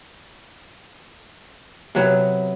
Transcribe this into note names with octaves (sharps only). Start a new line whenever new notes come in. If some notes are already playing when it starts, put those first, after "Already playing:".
C3 F#3 B3